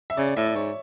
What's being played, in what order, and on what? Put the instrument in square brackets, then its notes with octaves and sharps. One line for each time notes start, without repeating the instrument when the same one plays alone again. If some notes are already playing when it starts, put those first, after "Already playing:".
[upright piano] E5
[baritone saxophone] C#3 [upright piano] D5
[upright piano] D5
[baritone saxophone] A2 [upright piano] E5
[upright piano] D5
[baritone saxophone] G#2 [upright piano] C#5